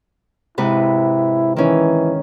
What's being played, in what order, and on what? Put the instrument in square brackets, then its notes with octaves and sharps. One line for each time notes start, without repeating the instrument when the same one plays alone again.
[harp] G#2 C3 B4 [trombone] E4
[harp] D#3 C#4 [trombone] E3